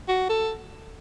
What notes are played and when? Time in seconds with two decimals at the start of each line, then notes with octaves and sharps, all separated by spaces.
0.08 F#4
0.29 A4